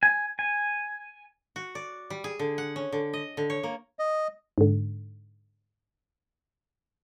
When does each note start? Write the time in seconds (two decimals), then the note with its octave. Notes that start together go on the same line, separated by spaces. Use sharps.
0.03 G#5
0.39 G#5
1.56 F#4
1.75 D5
2.10 G3
2.24 G#4
2.39 D3
2.58 F#5
2.76 C#4
2.92 D3
3.13 D#5
3.37 D3
3.50 C#5
3.63 A#3
3.99 D#5
4.58 G#2 D3